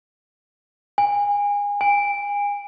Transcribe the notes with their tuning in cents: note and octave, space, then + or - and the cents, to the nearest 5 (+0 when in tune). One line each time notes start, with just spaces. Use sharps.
G#5 -30
G#5 -35